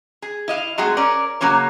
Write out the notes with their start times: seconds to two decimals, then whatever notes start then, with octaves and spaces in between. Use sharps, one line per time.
0.22 G#4
0.48 E4 D#5 F5
0.78 F#3 G#3 A3 C4 F#4 G#4
0.97 C#4 A#4 D5
1.41 C#3 F#3 A#3 C#4 C#5